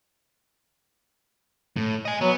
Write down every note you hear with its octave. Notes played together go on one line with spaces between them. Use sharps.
A2
D#5 G#5
F#3 B3